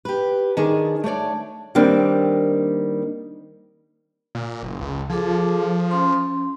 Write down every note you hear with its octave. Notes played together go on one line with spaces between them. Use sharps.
G4 B4
D#3 D4 G#4 G#5
A3 D4 C#5 D5
D#3 G3 A#3 C4 D4
A#2
F#1
C#2
F3 G#4 A4 D6
C#4 C6